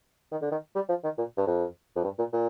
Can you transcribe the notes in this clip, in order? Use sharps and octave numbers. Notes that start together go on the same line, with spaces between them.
D#3
D3
D#3
G3
F3
D#3
A#2
G2
F2
F2
G2
A#2
A#2